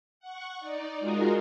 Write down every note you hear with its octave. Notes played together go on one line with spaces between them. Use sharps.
F#5 C#6
D#4 D5
G#3 D#4 F4 F#4 G#4 A#4